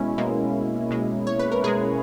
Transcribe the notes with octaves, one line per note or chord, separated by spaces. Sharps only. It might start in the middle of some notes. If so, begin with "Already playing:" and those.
Already playing: B2 G#3 C#4 E4
B2 G#3 A#3
B2 G#3
C#5
B4
A#4
B2 G#3 G#4